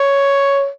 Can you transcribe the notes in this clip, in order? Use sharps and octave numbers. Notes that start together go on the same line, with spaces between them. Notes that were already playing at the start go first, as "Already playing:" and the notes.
Already playing: C#5